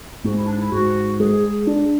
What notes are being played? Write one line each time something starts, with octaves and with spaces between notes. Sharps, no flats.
G#2 F#4
E4
D4
E4
G#2 F#4
G#3 G#4
D4